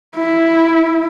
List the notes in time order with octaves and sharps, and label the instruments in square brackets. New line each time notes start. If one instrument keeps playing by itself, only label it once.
[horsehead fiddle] E4